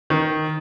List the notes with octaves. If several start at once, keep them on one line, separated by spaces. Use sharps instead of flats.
D#3